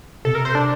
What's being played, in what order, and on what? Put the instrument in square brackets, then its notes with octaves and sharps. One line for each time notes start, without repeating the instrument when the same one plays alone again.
[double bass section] C3 [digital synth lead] A4
[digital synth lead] A#4
C5
D4